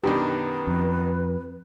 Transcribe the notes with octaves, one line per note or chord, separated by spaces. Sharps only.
F#2 B2 D#3 D4 G4 B4
F2